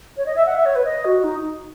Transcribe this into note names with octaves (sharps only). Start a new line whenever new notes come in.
C#5
D#5
E5
F#5
E5
C#5
B4
D#5
F#4
D#4